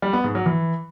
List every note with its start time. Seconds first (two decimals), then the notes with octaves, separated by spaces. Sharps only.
0.02 G3
0.13 B3
0.24 G#2
0.35 F#3
0.46 E3